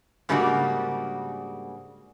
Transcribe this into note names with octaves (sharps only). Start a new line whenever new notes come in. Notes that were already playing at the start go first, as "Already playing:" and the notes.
G#2 C#3 G3 A#3 D4 F#4